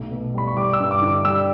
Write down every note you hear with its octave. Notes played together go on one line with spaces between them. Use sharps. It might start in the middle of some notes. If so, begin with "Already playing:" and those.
Already playing: B1 A3
B2
G3 B5
C#6
G3 D6
E6
G2
D6
D3
D6
G3 E6